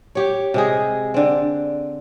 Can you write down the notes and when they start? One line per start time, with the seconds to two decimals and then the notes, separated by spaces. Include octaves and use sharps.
0.15 G4 C#5
0.54 C3 G#3 G#4
1.14 D3 C4